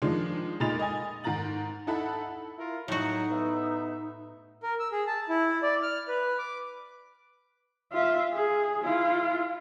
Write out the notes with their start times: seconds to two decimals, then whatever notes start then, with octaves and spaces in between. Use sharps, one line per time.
0.02 D#3 F3 G#3 D4
0.60 A#2 G#3 D#4 B5 A6 F7
0.79 D#5 G#5
1.24 G#2 D#3 A#5 A6 F#7
1.87 D#4 E4 A4 F#5 A5 B5
2.59 E4 F4 A#4
2.88 A2 F#3 D#4 F#4
3.31 B3 E5
4.63 A#4
4.80 E6
4.92 G#4
5.07 A5
5.29 E4
5.63 D5
5.82 F6
6.08 B4
6.38 D6
7.92 F4 E5
8.33 G#4
8.84 E4 F4